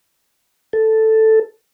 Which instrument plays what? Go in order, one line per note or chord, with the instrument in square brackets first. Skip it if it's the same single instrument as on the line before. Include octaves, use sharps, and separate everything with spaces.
[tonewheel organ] A4